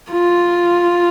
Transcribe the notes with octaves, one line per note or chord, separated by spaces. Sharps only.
F4